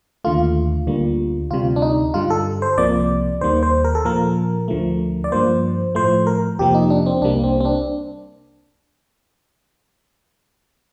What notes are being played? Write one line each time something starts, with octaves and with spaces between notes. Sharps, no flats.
D#2 D3 A3 F4
D2 D3 G3 A#3
D2 C3 G3 F4
D4
D#4
G2 D3 G3 F4
A4
C5
C2 C3 F3 A#3 D5
D#2 D#3 G3 A#3 C5
C5
A#4
A4
A#2 F3 A#3 A#4
D2 D3 F3 A3
D5
G2 F3 A#3 C5
A2 F3 A3 C5
A#4
F2 C3 F3 A#3 G4
D#4
D4
C4
C2 C3 G3 A#3 D4
C4
C4
D4